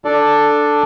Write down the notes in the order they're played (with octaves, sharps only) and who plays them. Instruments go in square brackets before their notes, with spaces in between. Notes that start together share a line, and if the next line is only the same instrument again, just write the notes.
[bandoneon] D4 A4 D5